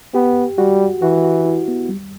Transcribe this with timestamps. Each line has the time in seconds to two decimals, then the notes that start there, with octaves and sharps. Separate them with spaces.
0.14 B3 G4
0.58 G3 F#4
1.02 E3 F#4
1.24 F#4
1.45 E4
1.68 B3
1.89 G3